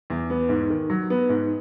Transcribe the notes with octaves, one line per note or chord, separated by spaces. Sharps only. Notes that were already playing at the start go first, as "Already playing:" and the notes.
E2
B3
G#2
D#3
F#3
B3
G#2